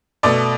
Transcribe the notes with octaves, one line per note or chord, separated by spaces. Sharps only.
B2 A3 D5